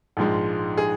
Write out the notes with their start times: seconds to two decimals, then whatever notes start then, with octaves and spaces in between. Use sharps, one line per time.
0.17 A#1 G#2 F3 G#3
0.77 G#4